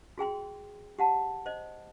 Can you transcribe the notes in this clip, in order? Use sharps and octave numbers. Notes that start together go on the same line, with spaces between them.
F#4 G#4 G5 C6
G4 F#5 A5
C5 D#5